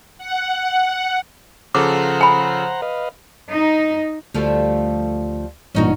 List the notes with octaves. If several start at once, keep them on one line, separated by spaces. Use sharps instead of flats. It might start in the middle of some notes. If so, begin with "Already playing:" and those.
F#5
C#3 F3 A4 C5 F#5 A#5 D6
G#5 B5
B4 D#5 F5
D#4
D2 F3 G3 A3
A1 G2 A#2 C#4 D#4 F#4